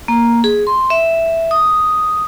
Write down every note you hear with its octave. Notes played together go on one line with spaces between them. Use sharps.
A#3
G#4
C6
E5
D#6